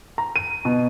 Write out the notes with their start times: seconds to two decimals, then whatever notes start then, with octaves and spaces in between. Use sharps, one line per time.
0.18 A#5
0.36 D#7
0.65 B2